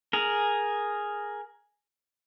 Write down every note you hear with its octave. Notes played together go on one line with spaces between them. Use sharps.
G#4 A#4